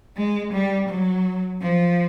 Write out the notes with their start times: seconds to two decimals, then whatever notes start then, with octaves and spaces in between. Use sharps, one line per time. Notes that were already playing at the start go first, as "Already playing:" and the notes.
0.17 G#3
0.53 G3
0.89 F#3
1.61 F3